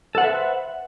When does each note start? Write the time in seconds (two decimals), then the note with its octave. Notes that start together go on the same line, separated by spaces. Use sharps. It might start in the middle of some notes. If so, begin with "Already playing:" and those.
0.15 A4
0.18 F#5
0.21 C5
0.24 E5
0.27 B4